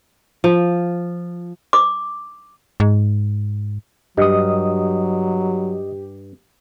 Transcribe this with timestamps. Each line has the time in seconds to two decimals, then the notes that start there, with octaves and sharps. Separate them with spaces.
0.44 F3
1.73 D6
2.80 G#2
4.17 G2 F#3 G4 D#5 D#6